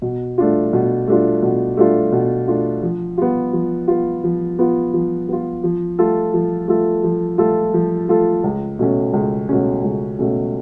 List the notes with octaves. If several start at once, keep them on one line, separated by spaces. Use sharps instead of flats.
B2
A3 D4 F4
B2
A3 D4 F4
B2
A3 D4 F4
B2
A3 D4 F4
F3
B3 F4
F3
B3 F4
F3
B3 F4
F3
B3 F4
F3
A3 F4 A4
F3
A3 F4 A4
F3
A3 F4 A4
F3
A3 F4 A4
C#2
B2 A3 C#4
C#2
B2 A3 C#4
C#2
B2 A3 C#4